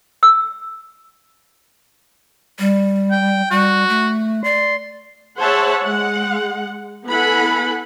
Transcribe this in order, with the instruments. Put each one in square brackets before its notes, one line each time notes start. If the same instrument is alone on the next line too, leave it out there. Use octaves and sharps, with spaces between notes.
[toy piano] E6
[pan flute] G3
[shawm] G5
[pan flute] G3 [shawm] F#4
[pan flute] A3
[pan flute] D5 [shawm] C6
[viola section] G#4 C5 C#5 E5 F#5 A5
G#3 F#5
B3 E4 A4 F#5 G#5 B5